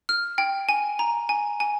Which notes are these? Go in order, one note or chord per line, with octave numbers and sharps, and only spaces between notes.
F6
G5
G#5
A#5
G#5
G#5